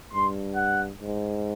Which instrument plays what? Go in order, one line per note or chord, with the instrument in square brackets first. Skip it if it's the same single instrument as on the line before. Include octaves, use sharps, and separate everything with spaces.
[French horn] G2 [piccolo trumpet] C6
[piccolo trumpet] F#5
[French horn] G#2